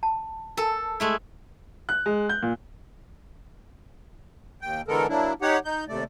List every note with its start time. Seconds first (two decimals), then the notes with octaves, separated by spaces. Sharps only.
0.03 A5
0.57 A4 A#4 G#5 A5
1.00 G#3 A3 E4
1.89 F#6
2.06 G#3
2.29 G6
2.42 A#2
4.62 D#2 G5
4.88 D3 E3 G#3 B3 A4 A#4
5.09 F#3 A#3 D4 E4
5.42 D#4 G4 C#5 F#5
5.65 D#4 G6
5.88 D#2 C3 A3 D5